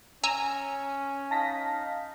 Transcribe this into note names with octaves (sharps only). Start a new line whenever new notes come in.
C#4 G#5 A#5 E6
D#4 F5 A5 A#6 B6